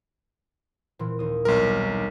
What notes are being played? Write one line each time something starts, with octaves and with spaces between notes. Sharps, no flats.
A#2 E3 C4
D#2 D#6
B1 G3 C4 A#4